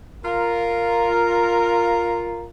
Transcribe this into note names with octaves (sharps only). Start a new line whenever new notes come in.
F4 A#4